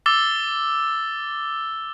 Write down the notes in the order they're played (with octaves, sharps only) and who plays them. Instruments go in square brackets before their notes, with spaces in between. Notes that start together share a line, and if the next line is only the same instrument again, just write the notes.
[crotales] D6 E6 A6 G7